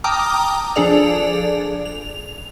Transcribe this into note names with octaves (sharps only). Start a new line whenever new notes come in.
G5 A5 A#5 D6 D#6 F6
F3 D4 G#4 A4 D5 F7
F7